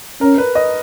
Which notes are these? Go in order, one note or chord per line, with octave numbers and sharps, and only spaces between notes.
C#4 A#4
B4
D#5